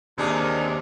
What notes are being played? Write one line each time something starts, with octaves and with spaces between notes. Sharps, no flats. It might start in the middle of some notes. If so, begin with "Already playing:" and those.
D#2 C3 A#3 D4 D#4 G#4